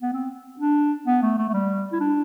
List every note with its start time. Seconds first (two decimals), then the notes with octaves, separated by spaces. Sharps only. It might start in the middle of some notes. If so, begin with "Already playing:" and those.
0.02 B3
0.13 C4
0.60 D4
1.07 B3
1.22 A3
1.38 A3
1.49 A3
1.53 G3
1.92 E4
2.00 D4